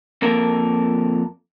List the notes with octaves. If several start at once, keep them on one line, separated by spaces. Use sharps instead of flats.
F2 A#3 A4 A#4